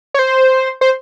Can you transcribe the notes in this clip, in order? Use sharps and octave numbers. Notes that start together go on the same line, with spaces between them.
C#5
C5
C5